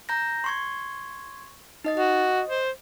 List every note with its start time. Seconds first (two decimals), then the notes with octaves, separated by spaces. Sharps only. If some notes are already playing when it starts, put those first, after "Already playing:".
0.09 A#5 G6 A#6
0.44 C6 C#6 G#6
1.84 D#4 D#5 A6
1.97 F#4 D#5
2.49 C5